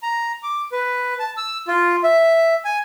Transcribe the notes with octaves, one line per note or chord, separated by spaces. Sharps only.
A#5
D6
B4
A5
E6
F4
E5
G#5